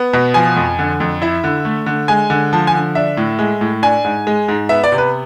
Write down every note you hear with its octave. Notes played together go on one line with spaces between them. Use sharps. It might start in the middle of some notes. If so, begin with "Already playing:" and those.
Already playing: B3
B2
F3 G#5
F2
D3
F2
E4 E5
D3
A3
D3
G#3 G#5
D3
F3 A5
G#5
D3
D4 E5
A2
G#3
A2
D4 G#5
G#2
G#3
G#2
B3 E5
D5
C3
B4